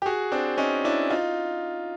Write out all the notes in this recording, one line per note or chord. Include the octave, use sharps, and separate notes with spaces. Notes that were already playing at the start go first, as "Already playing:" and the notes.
G4
F#4 G#4
C4 D4
C#4 D#4
D4 E4
D#4 F4